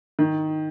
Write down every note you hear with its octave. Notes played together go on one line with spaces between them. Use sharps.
D#3